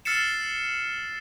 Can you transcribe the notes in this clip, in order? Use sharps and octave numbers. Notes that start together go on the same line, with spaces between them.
E6 F6 A6 C7 C#7 E7